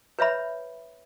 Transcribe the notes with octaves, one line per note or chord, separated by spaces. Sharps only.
B4 C#5 E5 B5